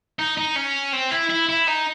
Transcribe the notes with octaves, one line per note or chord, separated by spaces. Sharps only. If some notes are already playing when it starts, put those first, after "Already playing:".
D#4
D#4
C#4
C4
E4
E4
E4
D#4